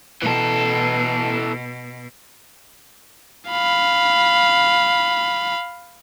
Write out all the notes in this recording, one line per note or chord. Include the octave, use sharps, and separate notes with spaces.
B2 E3 A4
F5 B5